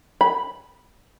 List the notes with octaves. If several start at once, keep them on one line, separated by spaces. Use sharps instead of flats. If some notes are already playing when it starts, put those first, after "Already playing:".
B5